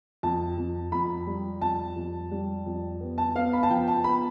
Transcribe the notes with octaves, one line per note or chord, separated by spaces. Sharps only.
F2 A5
F2
F2 B5
G3
F2 A5
F2
G3
F2
B3
A5
B3 F5
B5
A5
F3 G5
A5
B3 B5